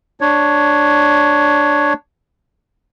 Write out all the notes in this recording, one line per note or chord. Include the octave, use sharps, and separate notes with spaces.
D4 C#5